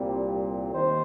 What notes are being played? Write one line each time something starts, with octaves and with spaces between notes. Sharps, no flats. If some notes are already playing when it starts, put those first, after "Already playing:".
Already playing: C2 A#2 G3 C4
D#2 D#3 C5